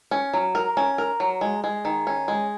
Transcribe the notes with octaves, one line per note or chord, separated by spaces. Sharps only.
C#4
F#3
A#4
C#4
A#4
F#3
G#3
G#3
D#3
C#4
G#3